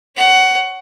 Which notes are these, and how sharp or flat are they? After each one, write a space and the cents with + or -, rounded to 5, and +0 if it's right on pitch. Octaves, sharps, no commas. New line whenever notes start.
C#5 +0 F#5 +15